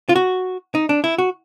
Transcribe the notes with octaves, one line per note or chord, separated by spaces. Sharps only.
F4
F#4
D#4
D4
E4
F#4